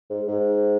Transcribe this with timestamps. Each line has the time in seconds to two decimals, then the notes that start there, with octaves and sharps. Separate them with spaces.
0.10 G#2
0.28 G#2